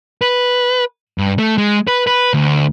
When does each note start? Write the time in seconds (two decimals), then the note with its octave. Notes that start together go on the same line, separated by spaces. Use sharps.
0.22 B4
1.18 G2
1.38 A3
1.58 G#3
1.87 B4
2.07 B4
2.34 D2